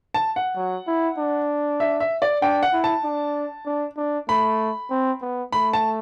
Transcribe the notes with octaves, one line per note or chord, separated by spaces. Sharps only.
A5
F#5
F#3
E4
D4
E5
E5
D5
D4 G5
F#5
E4
A5
D4
D4
D4
A3 B5
C4
B3
A3 B5
A5